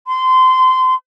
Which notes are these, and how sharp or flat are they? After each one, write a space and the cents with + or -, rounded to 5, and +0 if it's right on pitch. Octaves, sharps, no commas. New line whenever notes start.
C6 -25